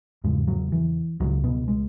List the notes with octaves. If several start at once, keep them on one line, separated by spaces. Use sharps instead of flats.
E2 G#2 C#3 G#3
F#3
E3
C#2 C#3 F#3
B2 B3
G#3